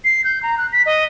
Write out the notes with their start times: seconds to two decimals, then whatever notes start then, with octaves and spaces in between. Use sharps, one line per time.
0.05 C7
0.24 G6
0.43 A#5
0.58 F#6
0.73 B6
0.86 D#5